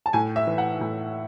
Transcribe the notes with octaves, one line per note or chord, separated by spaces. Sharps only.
A5
A2 G#5
E5
E3
F#5
A2